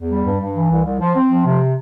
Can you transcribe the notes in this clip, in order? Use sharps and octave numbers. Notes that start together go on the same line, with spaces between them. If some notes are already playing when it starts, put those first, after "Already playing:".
Already playing: E2
G3
G2
G2
E3
C2
C2
F3
C4
F3
C3